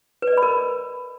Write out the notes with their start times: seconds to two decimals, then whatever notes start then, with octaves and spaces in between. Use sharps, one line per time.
0.22 B4
0.27 D5
0.32 D#5
0.37 B5
0.43 A#4